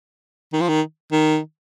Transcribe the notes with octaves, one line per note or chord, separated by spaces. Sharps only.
D#3
F3
D#3
D#3